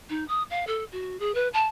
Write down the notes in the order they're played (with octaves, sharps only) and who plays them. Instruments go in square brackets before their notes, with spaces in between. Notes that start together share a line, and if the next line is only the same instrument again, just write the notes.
[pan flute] D#4
D#6
F5
A4
F#4
G#4
B4
A5